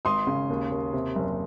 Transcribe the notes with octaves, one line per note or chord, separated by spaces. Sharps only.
G#1 C6 D#6
C#3
D#2
D#2
C3
F#1